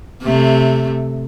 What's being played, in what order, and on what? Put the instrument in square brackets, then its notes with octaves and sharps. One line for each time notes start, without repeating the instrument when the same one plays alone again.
[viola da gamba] C3 A3